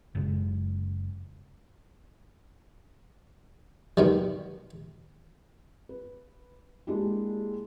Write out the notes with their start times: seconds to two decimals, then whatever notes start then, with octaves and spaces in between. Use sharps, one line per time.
0.15 F#1 F#2 C#3 G#3
3.97 B2 D#3 G3
5.89 B4
6.87 G#3 A#3 D4 E4 G4